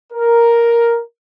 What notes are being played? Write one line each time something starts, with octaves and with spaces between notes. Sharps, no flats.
A#4